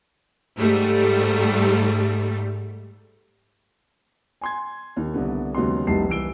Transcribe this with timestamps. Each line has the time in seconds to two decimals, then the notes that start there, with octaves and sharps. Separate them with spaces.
0.59 G#2 G3 A3
4.41 G#5 C6 G#6
4.96 D#2 D#3
5.14 C2 D3 B3
5.55 D#2 C#3 F#3 G#3 B3 C6
5.87 F1 C2 D#4 A5 C7
6.08 C2 E3 E6 D7 G7